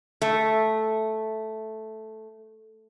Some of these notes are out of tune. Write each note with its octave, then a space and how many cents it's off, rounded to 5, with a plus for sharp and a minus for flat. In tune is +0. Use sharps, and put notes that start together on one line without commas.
A3 -5